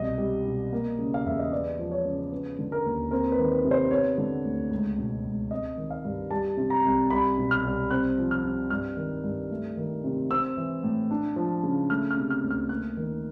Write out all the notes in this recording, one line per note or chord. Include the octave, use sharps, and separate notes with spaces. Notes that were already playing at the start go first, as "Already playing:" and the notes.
Already playing: C2 B2 D#5
G3
B2
A#3
C#3
F5
E2 E5
D#5
B3 D5
F3
C#5
C#3
B3
D3
A#4
D#2
C4 A#4
B4
D#3
B4
C3
C5
B3 C#5
D3
D2
C#2
B2
C#2
C4 D#5
D#3
F5
G2
G3 A5
C3
A#5
C2
C2 B5
B2
F6
C2
C4 F#6
F3
F6
C3
G2 F6
D#3
G2
A3
D#3
C3
C4 E6
E3
A2
D4
F3
C#3
A3 F6
F6
C3
F6
D2
F6
A#3 F#6
D#3